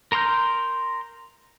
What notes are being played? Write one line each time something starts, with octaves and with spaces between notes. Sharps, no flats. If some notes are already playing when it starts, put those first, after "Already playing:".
A#4 A#5 C6 F6 G6